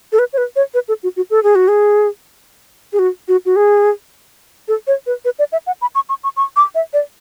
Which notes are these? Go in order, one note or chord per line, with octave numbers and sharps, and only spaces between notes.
A4
B4
C#5
B4
C#5
B4
A4
F#4
F#4
A4
G#4
F#4
G#4
G#4
F#4
F#4
F#4
G#4
A4
C#5
B4
B4
D5
E5
F#5
B5
C#6
C#6
C#6
C#6
D6
E5
D5